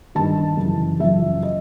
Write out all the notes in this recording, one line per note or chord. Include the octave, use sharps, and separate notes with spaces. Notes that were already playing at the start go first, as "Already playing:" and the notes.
G2 D#3 A5
F#2 C#3 E3
F#2 C#3 F3 E5
D#5